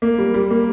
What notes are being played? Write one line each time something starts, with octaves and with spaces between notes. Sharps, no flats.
A#3
G3
G3
A#3